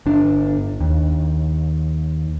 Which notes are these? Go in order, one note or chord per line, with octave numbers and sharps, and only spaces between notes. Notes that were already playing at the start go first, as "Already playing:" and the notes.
G1 D4
D#2